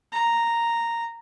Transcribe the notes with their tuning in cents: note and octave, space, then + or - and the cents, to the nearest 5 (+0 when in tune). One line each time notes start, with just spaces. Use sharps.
A#5 -5